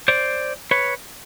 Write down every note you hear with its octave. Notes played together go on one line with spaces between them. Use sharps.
C5 D5
B4 C#5